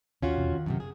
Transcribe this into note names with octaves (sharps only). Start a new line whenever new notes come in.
D#2 C#4 F4 F#4
E1 E2 C3
D#3
F#2 A2 C3
G#4